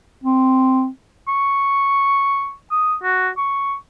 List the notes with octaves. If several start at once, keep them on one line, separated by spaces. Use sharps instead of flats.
C4
C#6
D#6
F#4
C#6